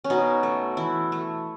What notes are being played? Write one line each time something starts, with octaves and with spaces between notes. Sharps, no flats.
C#4
B2 D#4
A3
E3 E4
A3